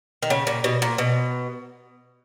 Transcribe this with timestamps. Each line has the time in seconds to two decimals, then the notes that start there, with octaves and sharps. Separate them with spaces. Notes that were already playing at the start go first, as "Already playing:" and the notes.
0.23 D#3
0.30 C#3
0.47 A#2
0.64 B2
0.82 A#2
0.98 B2